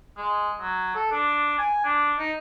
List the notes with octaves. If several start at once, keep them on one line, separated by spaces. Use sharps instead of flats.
G#3
F#3
A4
D4
G#5
D4
D#4